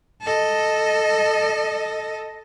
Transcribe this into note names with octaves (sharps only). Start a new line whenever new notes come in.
A4 D#5